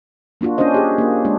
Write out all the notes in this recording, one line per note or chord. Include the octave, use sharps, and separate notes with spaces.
A#3 D4 F4 F#4
C#4 D4 F#4 C5 D#5
G4 G#4
A#3 F4
G#3 D4